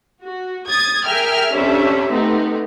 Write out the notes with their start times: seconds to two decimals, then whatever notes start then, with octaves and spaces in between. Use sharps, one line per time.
0.21 F#4
0.67 D#6 G#6 A6
1.04 G#4 A#4 E5 G5 G#5 F6
1.52 F2 C3 C#4 D4 G4 E5
2.11 C3 A3 B3 C4 D#4